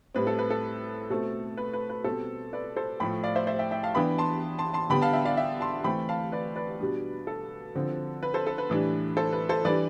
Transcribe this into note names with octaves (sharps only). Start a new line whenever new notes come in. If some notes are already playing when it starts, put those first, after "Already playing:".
A2 G3 C4 B4
A4
B4
A4
B2 A3 C4 A4
B4
B4
B4
B2 G3 C4 A4 C5
B4 D5
A4 C5
A2 F3 A3 G5 B5
D5 F5
C5 E5
C5 E5
E5 G5
E5 G5
F5 A5
E3 B3 D4 G5 B5
A5 C6
A5 C6
A5 C6
D3 G3 B3 D4 G5 B5
F5 A5
E5 G5
D5 F5
E5 G5
A5 C6
E3 A3 C4 G5 B5
F5 A5
B4 D5
B4 D5
B2 G3 D4
A4
D3 F3 C4
B4
A4 C5
A4
B4
A2 E3 G3 D4
A4 C5
B4
A4 C5
E3 G3 D4 B4 D5